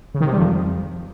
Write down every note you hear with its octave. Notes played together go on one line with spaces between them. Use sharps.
C#3
D#3
C3
G3
F2